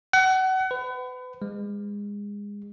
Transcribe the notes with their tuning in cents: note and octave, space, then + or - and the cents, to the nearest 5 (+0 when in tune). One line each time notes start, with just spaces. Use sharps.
F#5 +30
B4 +35
G#3 -25